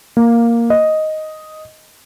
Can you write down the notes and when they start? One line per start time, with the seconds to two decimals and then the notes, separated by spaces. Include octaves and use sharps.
0.17 A#3
0.70 D#5